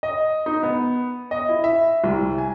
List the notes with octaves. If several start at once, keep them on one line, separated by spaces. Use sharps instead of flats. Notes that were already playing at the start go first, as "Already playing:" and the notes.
D#5
D#4
B3
D#5
E4
E5
C2
G#5